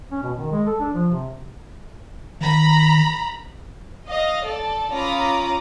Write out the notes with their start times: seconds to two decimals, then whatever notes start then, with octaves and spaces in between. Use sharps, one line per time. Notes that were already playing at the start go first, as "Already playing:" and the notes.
0.11 C#4
0.23 B2
0.37 D#3
0.51 G#3
0.67 A4
0.80 D4
0.94 F3
1.11 C3
2.41 D#3 A#5 B5
4.07 D#5 F5
4.46 A4 D5
4.93 C#4 F4 A#5 B5 D6 D#6